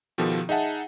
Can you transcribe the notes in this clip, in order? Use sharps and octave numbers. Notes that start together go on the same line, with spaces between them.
B2 D#3 F3 B3 G4 A4
D#4 G#4 E5 F#5 A5